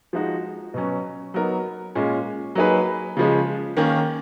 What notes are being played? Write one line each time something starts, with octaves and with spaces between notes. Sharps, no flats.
F3 G#3 D#4 F#4
B2 F#3 C#4
F#3 B3 D#4 A#4
A#2 G#3 C#4
F#3 A#3 D#4 G#4 B4
C#3 F3 G#3
D#3 A#3 C#4